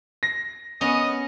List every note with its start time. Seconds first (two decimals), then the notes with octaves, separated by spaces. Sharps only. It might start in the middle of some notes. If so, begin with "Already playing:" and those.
0.23 A#6
0.81 B3 C#4 D#5